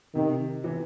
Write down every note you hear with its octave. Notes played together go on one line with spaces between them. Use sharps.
C3 D#3
E3